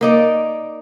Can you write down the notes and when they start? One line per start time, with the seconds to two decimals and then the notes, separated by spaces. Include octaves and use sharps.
0.01 A#3 D#4 D5